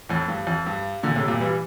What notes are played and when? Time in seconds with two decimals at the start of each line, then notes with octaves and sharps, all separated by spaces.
0.09 F2 A2
0.28 G2
0.47 F2
0.66 G2
1.03 A#2 D3
1.16 A2 C3
1.28 G2 A#2
1.40 E3 G3